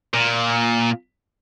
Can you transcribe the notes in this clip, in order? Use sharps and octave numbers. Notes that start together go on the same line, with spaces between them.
A#2